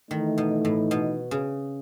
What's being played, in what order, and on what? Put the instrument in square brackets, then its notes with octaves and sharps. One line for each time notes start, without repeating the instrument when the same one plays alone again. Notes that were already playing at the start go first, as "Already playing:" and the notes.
[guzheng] D#3 [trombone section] E3 A3 D#4
[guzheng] B2
A2
B2
C#3